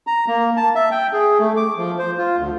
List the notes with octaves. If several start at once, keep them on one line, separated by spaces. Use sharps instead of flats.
A#5
A#3
A5
E5
G5
G#4
A3
D6
F3
C5
F4
D2